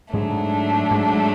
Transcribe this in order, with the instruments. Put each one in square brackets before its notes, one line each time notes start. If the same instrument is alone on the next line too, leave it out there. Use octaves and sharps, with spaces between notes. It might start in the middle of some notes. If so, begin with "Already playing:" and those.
[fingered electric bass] G#2 G#3 [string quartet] F#3 A3 D4
[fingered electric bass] G#2 G#3